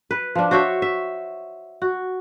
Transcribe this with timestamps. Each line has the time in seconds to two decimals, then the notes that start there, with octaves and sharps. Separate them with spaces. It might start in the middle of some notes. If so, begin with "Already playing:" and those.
0.11 B4
0.35 F3 D4
0.51 F#4 C5 C#5 E5
0.82 E5
1.82 F#4